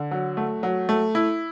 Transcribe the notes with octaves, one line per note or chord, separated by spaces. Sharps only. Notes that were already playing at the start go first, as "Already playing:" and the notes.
Already playing: D3
F#3
A3
F#3
A3
E4